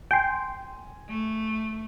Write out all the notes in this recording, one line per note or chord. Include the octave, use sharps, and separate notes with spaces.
G5 G#5 C6
A3